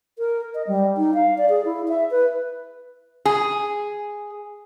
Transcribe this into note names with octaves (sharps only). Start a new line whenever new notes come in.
A#4
D#5
G3
D#4
F5
D5
G#4
E4
E5
B4
G#4